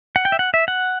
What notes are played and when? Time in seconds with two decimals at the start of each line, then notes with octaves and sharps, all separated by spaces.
0.16 F#5
0.25 G5
0.32 E5
0.39 F#5
0.54 E5
0.68 F#5